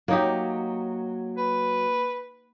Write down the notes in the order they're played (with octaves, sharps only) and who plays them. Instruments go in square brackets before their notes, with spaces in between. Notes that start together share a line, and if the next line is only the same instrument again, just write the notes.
[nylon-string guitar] F#3 [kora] A#3 D#4 G4
[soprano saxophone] B4